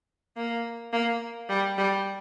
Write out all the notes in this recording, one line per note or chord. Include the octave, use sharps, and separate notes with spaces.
A#3
A#3
G3
G3